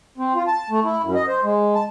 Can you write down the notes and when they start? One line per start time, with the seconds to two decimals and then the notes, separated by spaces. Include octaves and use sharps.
0.18 C4
0.35 F4
0.47 A5
0.70 A3
0.84 E4
1.03 F#2
1.15 D#5
1.28 C5
1.44 G#3
1.75 A5